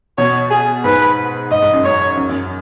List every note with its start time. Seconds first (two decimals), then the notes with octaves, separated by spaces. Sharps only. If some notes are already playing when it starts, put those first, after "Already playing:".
0.18 B2 C#5
0.51 G#4
0.84 G#2 B4
1.51 G#2 D#5
1.62 G#2
1.73 F#2
1.84 G#2 C#5
2.17 F#2
2.29 F#2